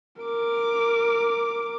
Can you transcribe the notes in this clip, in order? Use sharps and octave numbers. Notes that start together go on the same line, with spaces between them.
A#4 D6